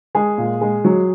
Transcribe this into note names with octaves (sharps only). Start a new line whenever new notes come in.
G#3 G#4
A#2
G#3
F#3